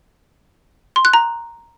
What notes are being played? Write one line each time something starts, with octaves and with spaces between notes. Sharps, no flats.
C6
F#6
A#5